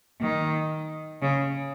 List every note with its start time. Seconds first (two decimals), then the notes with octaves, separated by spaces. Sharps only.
0.21 D#3
1.22 C#3